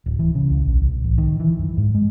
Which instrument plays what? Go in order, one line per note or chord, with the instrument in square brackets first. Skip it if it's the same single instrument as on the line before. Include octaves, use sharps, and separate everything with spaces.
[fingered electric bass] D1
E3
C#3
C#2
A#1
C2
A1
D#3
E3
F#2
G#2
G#3